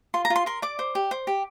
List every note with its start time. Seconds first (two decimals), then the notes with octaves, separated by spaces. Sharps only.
0.14 F4 C6
0.25 A#5
0.30 F4
0.36 C6
0.46 A#4 C6
0.62 D5 D6
0.79 C5
0.95 G4
1.11 C5
1.27 G4